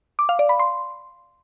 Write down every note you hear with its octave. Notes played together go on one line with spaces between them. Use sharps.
D6
F5
D5
B5
C6